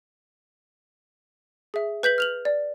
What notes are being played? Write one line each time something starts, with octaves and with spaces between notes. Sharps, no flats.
G#4 E5
B4 G6 B6 F#7
F6 F7 F#7
D5